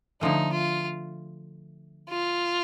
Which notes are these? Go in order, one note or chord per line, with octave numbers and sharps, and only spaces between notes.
D3 F3 A3 D#4
F4
F4